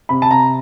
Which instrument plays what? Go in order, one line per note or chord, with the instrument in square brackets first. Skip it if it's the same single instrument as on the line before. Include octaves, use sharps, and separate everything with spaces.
[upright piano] C3 B5
A5
C3 A#5